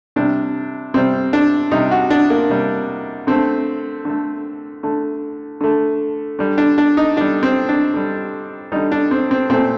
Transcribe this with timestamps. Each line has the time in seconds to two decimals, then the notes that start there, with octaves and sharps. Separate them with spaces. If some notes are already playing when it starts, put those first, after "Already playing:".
0.16 C3 G3 D4
0.94 C3 G3 C4
1.33 D4
1.71 C3 G3 D#4
1.91 F#4
2.10 D4
2.30 A#3
2.49 C3 G3
3.27 D3 A3 C4
4.05 D3 A3
4.83 D3 A3
5.61 D3 A3
6.39 D3 G3
6.58 D4
6.78 D4
6.97 D#4
7.17 D3 G3 D4
7.43 C4
7.69 D4
7.94 D3 G3
8.72 D3 G3 D#4
8.92 D4
9.11 C4
9.31 C4
9.50 A#2 A3 C4